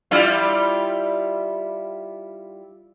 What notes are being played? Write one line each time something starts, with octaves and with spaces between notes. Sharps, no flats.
G3 E4 F4